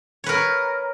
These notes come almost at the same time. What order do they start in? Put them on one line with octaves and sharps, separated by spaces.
C#5 B4 A#4